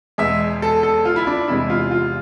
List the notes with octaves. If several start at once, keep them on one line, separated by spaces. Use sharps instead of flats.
E2 B2 G#3 E5
A4
A4
F4
E4
D4
E2 C3 G#3 E4
F4
F4